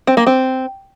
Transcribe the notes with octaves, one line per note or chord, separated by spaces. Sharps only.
C4
A#3
C4